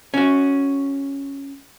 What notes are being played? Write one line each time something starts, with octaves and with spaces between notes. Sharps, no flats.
C#4 F#4